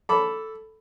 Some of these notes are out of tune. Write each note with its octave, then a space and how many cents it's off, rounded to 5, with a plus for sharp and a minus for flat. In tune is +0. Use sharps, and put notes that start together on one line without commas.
A4 +0 B5 +5 D6 -20